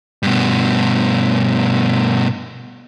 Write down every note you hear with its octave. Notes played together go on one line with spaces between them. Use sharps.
G2 B2